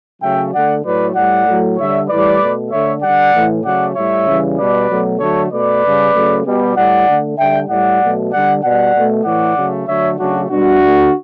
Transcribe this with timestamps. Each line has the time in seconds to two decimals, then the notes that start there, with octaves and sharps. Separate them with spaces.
0.22 C#3 F#3 A3 E5 G5
0.53 D3 A3 D5 F#5
0.84 A2 F#3 A3 B4 D5
1.15 A2 G3 D5 F#5
1.46 A2 F#3 A3
1.77 D3 G3 C#5 E5
2.09 A2 E3 G3 B4 D5
2.40 B2 A3
2.71 D3 A3 C#5 E5
3.02 D3 G3 D5 F#5
3.33 A2 E3 A3
3.64 C#3 F#3 A3 D5 F#5
3.95 A2 G3 C#5 E5
4.27 C#3 E3 G3
4.57 B2 G3 B4 D5
4.88 B2 F#3 A3
5.19 D3 F#3 A3 A4 C#5
5.51 B2 A3 B4 D5
5.83 C#3 G3
6.14 C#3 F#3 A3
6.45 B2 G3
6.76 A2 G3 D5 F#5
7.07 D3 A3
7.38 D3 G3 E5 G5
7.69 A2 G3 D5 F#5
8.00 B2 F#3 A3
8.32 D3 G3 D5 F#5
8.62 B2 G3 D5 F#5
8.93 B2 A3
9.24 A2 E3 A3 D5 F#5
9.56 C#3 F#3 A3
9.87 D3 F#3 A3 C#5 E5
10.18 C#3 F#3 A3 D4 F#4
10.49 B2 G3 D4 F#4
10.80 D3 A3